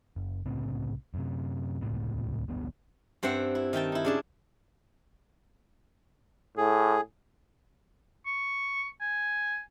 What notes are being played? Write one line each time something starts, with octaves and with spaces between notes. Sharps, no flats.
F#1
C2 A2 C#3 C4
F#2 C3
D#1 C#2 A2 C3
D1 A1 G2 B3
G2 C4 C5 E5 F#5
E4
D#3 E5 G5 A5
D#4 E4
C#3 D4 A5
A2 G#4
C#6
G#5